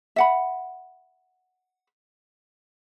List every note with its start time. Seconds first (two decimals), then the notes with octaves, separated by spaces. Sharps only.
0.16 E5 F#5 B5